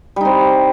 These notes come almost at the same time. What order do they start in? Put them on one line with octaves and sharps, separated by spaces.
G3 D#4 C4 G4